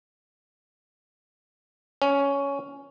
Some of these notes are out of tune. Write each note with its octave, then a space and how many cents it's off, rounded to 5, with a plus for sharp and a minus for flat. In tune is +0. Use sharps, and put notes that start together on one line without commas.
C#4 +10